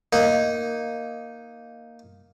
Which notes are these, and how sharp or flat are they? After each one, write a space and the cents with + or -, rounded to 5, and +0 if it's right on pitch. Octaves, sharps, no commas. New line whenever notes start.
A#3 +0 D#4 +0